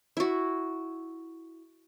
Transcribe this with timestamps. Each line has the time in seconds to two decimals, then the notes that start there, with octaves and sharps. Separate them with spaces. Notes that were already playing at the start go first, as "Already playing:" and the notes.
0.17 E4 F#4